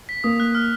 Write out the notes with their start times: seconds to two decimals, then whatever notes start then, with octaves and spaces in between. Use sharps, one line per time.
0.09 B6
0.24 A#3 D#6
0.40 F#6
0.55 F6